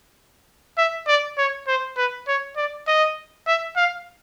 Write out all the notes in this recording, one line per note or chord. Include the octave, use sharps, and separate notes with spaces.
E5
D5
C#5
C5
B4
C#5
D5
D#5
E5
F5